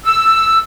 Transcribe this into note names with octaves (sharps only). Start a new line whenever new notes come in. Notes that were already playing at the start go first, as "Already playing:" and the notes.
E6